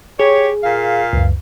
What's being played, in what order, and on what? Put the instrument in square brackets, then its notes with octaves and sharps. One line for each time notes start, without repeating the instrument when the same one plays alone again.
[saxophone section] G4 C#5 [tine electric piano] G#4
[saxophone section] A#2 F5
[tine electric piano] C#2 F#2